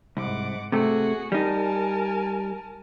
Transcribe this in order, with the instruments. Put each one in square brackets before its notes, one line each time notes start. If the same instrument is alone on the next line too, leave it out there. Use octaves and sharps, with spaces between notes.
[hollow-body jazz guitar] C2 [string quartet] G#2 F#5 D6
[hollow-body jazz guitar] C3 A3 [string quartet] F#4 G#4
[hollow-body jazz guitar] G3 D#4 [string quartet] A#4 G#5 A5